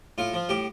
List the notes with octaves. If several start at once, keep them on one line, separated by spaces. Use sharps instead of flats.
A2 F4
F3
A2 G4